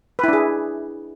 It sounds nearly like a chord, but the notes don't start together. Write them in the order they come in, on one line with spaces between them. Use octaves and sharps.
B4 E4 D4 G#4